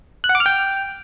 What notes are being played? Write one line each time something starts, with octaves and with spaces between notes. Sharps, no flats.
F#6
F#5
D6
F6
G5